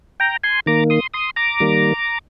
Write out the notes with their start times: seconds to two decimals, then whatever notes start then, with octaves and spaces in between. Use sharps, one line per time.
0.20 G5 A#5
0.43 G#5 C6
0.66 D#3 A#3 A#5 D6
0.90 C6 D#6
1.14 C6 D#6
1.36 A#5 D6
1.60 D#3 G3 A#3